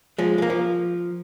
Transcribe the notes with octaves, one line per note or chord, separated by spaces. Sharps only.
F3 G#3
G#3
A#3
F3